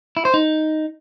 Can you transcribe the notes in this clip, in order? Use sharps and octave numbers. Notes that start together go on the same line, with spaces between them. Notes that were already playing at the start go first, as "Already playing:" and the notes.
E4
C5
D#4